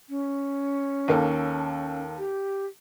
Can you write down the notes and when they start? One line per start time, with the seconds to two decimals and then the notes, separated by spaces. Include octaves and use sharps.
0.09 C#4
1.08 D#2 A#3 A4
2.18 G4